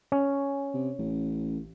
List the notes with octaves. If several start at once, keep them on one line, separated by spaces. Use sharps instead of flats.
C#4
C3
A1